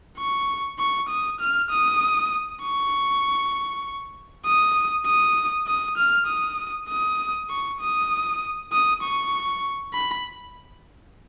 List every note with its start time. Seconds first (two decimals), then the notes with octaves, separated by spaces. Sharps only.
0.18 C#6
0.79 C#6
1.09 D#6
1.41 F6
1.71 D#6
2.62 C#6
4.46 D#6
5.06 D#6
5.67 D#6
5.97 F6
6.28 D#6
6.89 D#6
7.50 C#6
7.81 D#6
8.72 D#6
9.03 C#6
9.94 B5